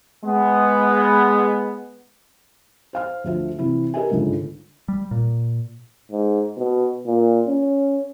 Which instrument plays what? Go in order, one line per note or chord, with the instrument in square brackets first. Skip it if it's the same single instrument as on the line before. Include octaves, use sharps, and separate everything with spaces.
[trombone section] G#3 B3
[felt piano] C5 F5 F6
D2 F3 E5
C3 E3 E4
G4 A#4 B4 D#5 E5 G#5
G1 C#2 G#2 D3
[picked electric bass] G3
A#2
[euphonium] G#2
B2
A#2
C#4